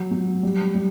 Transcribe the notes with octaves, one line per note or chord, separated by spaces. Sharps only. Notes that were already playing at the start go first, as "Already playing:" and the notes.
Already playing: F#3
F#3
G3
G3